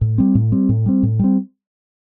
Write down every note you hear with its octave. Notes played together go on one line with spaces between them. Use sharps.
A2
G3 C4
A2
G3 C4
A2
G3 C4
A2
G3 C4